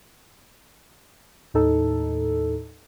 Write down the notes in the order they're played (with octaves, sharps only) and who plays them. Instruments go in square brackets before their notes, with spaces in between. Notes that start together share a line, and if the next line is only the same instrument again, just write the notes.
[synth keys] D#2 A2 D#4 A4